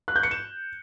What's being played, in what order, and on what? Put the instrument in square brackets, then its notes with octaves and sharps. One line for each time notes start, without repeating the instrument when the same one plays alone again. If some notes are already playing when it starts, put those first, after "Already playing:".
[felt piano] F#6
G6
C#7
E7